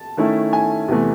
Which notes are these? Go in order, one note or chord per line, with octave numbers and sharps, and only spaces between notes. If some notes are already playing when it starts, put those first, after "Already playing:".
Already playing: A5
D#3 A3 C#4 E4
G#5
E2 C3 E3 A3